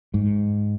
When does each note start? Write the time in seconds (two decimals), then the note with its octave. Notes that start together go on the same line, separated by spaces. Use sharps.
0.14 G#2